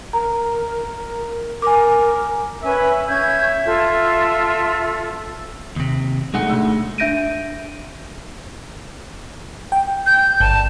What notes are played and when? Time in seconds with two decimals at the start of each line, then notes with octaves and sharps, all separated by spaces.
0.13 A#4 A#5
1.62 A#4 G#5 D6
2.62 C#4 B4 E5 G#5
3.07 C#4 E5 G6 G#6
3.64 F4 A4
5.76 D#2 C3
6.34 B1 G#3 A3 F#5 C#7
6.49 D2 E6
6.98 D4 E5 G6 A#6 D7 D#7
9.72 G5
10.06 G6
10.40 G1 A5